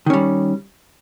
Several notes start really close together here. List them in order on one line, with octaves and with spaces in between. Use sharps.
D#3 C#4 G3